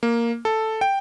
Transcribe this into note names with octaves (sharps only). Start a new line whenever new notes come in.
A#3
A4
G5